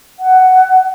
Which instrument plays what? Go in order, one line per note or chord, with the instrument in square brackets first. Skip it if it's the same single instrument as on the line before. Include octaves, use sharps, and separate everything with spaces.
[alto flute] F#5